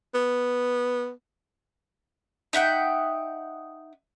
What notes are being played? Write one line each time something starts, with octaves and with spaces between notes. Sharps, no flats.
B3
D#4 E5 F#5 G5